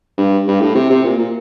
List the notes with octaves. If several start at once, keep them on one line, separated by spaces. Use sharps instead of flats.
G2
G2
A2
C3
C3
A#2
A#2